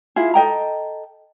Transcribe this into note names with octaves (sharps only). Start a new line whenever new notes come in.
E4 F4 G#4
A4 D#5 G5 A#5